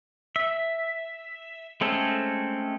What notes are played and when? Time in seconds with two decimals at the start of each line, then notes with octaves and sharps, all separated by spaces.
0.36 E5
1.81 G#3 A3 C4 C#4 A4